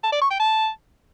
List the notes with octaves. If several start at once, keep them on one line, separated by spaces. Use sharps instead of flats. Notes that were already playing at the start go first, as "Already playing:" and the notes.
A5
D5
C#6
G5
A5